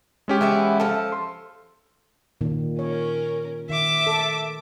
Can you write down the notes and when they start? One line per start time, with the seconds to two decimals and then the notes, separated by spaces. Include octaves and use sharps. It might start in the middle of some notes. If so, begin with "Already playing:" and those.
0.28 G#3 C#4 G4
0.41 E3 B3 E4
0.80 F3 A4
1.12 C6
2.41 A#2 D#3
2.79 C#4 A#4 C#5
3.70 D#3 E5 D6
4.07 A4